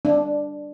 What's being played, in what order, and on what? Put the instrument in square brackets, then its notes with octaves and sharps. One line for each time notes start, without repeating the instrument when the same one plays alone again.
[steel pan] D4